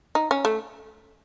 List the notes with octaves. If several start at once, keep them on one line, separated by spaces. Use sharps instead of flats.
D#4
C#4
A3